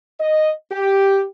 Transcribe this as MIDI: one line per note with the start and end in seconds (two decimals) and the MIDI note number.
0.20 0.52 75
0.72 1.24 67